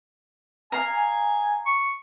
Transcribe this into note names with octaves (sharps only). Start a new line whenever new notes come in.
G#4 F5 G#5 A#5
C#6